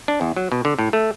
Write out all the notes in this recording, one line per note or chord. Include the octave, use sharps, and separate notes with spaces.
D4
E2
F#3
B2
D3
A2
A3